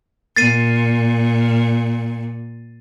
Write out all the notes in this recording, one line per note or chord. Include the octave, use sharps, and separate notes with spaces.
A#2 A6 C7 D#7